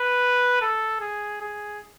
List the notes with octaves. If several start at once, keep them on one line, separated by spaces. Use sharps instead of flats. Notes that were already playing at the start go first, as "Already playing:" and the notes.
Already playing: B4
A4
G#4
G#4